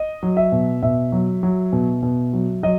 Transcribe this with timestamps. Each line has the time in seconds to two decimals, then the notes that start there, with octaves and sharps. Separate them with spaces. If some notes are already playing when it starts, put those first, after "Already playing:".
Already playing: D#5
0.23 F#3
0.37 E5
0.52 B2
0.83 B2 E5
1.12 F#3
1.43 F#3
1.73 B2
2.03 B2
2.33 F#3
2.63 F#3 D#5